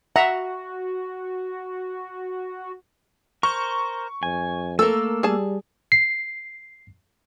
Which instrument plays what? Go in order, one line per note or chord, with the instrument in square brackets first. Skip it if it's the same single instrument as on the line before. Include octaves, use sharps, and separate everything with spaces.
[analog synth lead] F#4 [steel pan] E5 A#5 [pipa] F#5
[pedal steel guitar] A#4 C5 [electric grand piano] C#6
[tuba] F2 [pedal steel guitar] G#5
[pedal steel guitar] A3 A#3 [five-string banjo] A4 A#4 [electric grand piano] E6
[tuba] G3 [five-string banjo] G#4 A5
[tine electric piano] C7